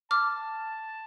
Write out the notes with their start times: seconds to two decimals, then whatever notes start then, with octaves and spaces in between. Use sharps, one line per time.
0.11 A5 D6 F6